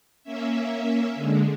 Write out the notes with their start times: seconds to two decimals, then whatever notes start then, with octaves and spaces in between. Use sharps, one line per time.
0.23 A#3 C#4 E5
1.15 D3 G#3